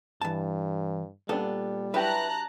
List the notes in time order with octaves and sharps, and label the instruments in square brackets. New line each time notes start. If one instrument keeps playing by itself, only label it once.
[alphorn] G2 [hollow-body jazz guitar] E3 A5
[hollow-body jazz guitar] A#2 A4 [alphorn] G3 [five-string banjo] B3 D4
[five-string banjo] F#3 D4 G4 [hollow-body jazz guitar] E4 B4 [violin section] A5 A#5 F#6